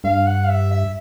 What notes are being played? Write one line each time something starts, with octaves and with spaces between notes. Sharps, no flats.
G2 F5
F#5
F5
E5
E5